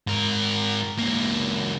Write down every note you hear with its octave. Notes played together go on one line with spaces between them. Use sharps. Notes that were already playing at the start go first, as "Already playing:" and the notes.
G#2 A#4
C#2 A#3